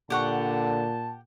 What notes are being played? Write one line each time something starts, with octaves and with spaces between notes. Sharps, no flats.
A#2 D3 G4 F#5 A5 C#6